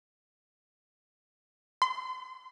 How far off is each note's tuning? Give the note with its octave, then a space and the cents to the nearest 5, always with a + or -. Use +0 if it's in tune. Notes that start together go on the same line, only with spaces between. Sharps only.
C6 -30